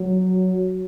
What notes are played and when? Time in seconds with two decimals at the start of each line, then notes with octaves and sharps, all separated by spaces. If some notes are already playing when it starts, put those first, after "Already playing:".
Already playing: F#3